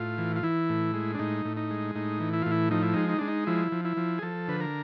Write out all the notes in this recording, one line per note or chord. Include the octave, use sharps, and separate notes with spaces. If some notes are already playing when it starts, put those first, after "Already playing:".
Already playing: A2 F4
E3
F4
E3 E4
A2
G#3
D4
A2 D#4
A2
D#4
G#3
A2 D#4
E3
E4
A2 F4
E4
F3 D#4
E4
G#3 D#4
D#4
G#3 D4
D#4
F3 E4
F3
E4
F3
G#4
F3 A4
D3 B4
A#4